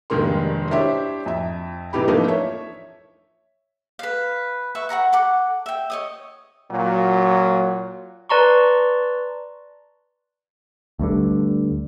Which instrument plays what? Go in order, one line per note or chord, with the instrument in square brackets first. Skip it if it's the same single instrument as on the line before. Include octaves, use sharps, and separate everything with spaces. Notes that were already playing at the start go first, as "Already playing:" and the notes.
[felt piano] F1 G2 D#3 G#3 A#3 C6
D4 E4 G4 C5 C#5 E5
F2 E5
C3 E3 D#4 G4 B5
E3 F3 A3 A#3 D4 D#4
C#5 E5
[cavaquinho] B4 F5
B4 E5 C#6
F#5 G5 A#5 C#6
A4 F#5 D6
E5 G5
C#5 D#5 D#6
[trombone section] A#2 F#3
[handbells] B4 D5 A5 A#5 C6 C#6
[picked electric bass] D2 G2 D3